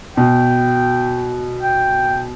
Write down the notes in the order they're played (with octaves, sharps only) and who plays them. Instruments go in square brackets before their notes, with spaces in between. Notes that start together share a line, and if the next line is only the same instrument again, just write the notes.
[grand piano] B2 [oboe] G5
[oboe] G5